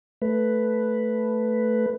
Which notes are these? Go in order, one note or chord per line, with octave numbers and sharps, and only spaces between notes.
A3 B4